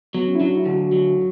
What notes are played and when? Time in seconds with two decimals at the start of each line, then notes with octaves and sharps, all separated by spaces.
0.14 F#3 B3
0.28 C#4
0.35 E4
0.40 F#3 D4
0.57 E4
0.65 D3 F#4
0.92 F#3